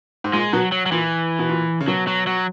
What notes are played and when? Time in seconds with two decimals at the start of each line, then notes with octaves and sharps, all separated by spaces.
0.24 G#2
0.33 A#2 G#3
0.53 B2 F#3
0.72 F#3
0.86 F#3
0.91 A#2 E3
1.39 B2
1.49 A#2
1.81 C#3
1.87 B2 F#3
2.07 F#3
2.27 F#3